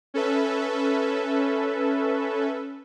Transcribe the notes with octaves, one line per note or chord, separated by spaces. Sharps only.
C#4 A4 B4 E5